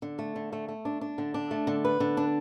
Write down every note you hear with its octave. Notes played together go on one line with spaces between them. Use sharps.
D3
A3
D3
A3
A3
D4
D4
D3
D4
A3
D3
B4
D3
D4